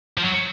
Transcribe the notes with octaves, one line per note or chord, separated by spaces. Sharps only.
F3
F#3